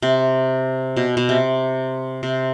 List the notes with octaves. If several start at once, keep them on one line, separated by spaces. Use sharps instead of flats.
C3
B2
B2
C3
C3